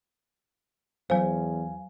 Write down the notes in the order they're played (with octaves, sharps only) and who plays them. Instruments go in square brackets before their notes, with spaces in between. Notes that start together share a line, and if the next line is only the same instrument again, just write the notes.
[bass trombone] E2 [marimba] F#3 C5 [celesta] F5 G#5